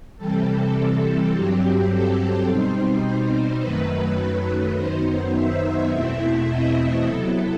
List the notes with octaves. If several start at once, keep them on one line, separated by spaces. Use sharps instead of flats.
C3 E3 G3 C4 A4
A4
G2 F#3 C4 G4
A4
B2 G3 C4 D#4 C5
F#2 D#3 F#3 A3 B4
F#2 D#3 F#3 B3 D#4 C5
E5
E2 B2 A3 C4 E4
D#5
C3 F#3 B3 E4 A4